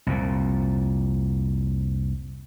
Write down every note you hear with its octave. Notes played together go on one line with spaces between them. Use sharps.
C2 F2 A#2